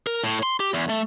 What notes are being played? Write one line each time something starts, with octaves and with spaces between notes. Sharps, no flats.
A#4
A2
C6
G4
E2
A3